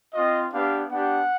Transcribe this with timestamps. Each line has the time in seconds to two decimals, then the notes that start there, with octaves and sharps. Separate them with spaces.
0.14 C4 F4 D#5
0.53 B3 D4 G4 F5
0.91 B3 D4 G4 F#5